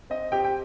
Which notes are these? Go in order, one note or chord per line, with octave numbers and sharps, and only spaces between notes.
C4 D#5
C4 G4 G5
G5